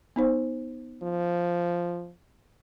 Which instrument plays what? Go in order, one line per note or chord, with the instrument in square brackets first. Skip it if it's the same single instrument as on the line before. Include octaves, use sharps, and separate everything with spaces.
[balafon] B3 D#4 C5
[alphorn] F3